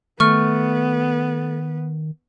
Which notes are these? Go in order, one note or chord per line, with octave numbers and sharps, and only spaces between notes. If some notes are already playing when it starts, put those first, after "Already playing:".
D#3 A3 B3 C#6 F6